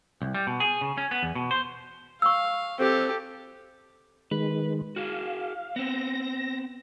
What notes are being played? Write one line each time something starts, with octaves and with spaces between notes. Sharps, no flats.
C2
G3
B2
G#4
C#3
C#4
B3
E2
B2
C5
F5 C#6 E6
C4 G4 A4
D#3 G#3 B4
F#4 G#4 F5
B3 C4 A#6